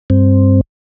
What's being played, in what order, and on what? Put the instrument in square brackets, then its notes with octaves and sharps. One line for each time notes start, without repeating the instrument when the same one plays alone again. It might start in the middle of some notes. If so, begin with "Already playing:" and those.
[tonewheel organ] G2 C4